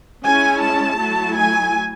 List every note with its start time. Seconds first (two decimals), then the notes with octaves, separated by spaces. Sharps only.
0.23 G#3 C#4 E4 G#5
0.61 A5
0.98 F#3 A3 E4
1.36 G#5